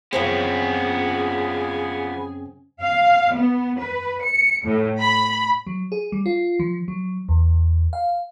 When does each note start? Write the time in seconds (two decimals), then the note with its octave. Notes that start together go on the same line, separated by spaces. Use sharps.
0.13 F#2 C#3 F3 B3 C4 G#4
2.81 F5
3.35 B3
3.79 B4
4.24 C#7
4.65 A2
4.99 B5
5.67 F#3
5.92 G#4
6.12 G3
6.26 F4
6.59 F3
6.88 F#3
7.29 E2
7.93 F5